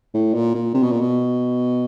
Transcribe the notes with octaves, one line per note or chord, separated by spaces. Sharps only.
A2
A#2
A#2
C3
B2
A#2
B2